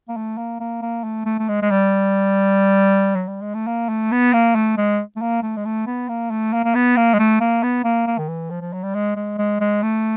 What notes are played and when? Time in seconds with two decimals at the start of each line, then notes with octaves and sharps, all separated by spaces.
0.09 A#3
0.17 A3
0.37 A#3
0.60 A#3
0.82 A#3
1.04 A3
1.25 A3
1.39 A3
1.48 G#3
1.62 G#3
1.70 G3
3.15 F#3
3.28 G3
3.41 G#3
3.54 A3
3.67 A#3
3.89 A3
4.12 B3
4.33 A#3
4.55 A3
4.77 G#3
5.16 A3
5.22 A#3
5.42 A3
5.56 G#3
5.65 A3
5.87 B3
6.09 A#3
6.31 A3
6.53 A#3
6.65 A#3
6.75 B3
6.97 A#3
7.14 G#3
7.19 A3
7.40 A#3
7.63 B3
7.84 A#3
8.07 A#3
8.18 D#3
8.28 E3
8.50 F3
8.61 F3
8.73 F#3
8.83 G3
8.95 G#3
9.16 G#3
9.38 G#3
9.60 G#3
9.82 A3